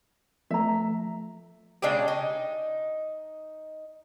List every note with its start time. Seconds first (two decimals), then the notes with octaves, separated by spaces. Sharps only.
0.51 F3 A3 E5 A#5
1.82 C#3 G#3 D4 G4
2.08 D#4